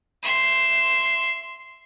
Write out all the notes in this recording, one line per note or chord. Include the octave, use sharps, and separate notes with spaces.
E5 C6